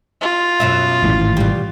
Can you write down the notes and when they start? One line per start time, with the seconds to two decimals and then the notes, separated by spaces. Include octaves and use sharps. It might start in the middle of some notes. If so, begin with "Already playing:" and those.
0.21 F4
0.60 F#2 B2 E5
1.02 G#1 A2 E3
1.37 B2 G3